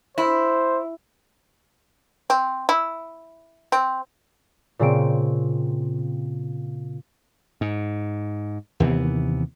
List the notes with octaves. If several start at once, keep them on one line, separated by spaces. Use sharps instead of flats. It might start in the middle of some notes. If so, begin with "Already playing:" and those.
E4 C5
C4
E4
C4
A#2 C#3 C4 D7
G#2
D#2 C3 E3 B3